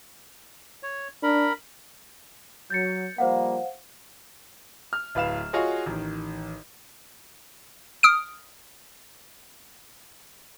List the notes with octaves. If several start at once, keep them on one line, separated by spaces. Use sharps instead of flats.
C#5
D4 A#4 B5
F#3 G6 A6 C#7
F3 G3 A#3 C5 F5 F#5
F6
D1 B4 F5 E7
F4 F#4 G#4 C#5 D#5
A1 D#3
D#6 F6 D7